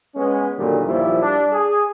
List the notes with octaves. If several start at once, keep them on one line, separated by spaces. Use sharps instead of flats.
G#3 B3 C#4
F#2 A#2 D3 D#3 G3
A#1 D#2 F3 G3 E4
G3 D4
G#4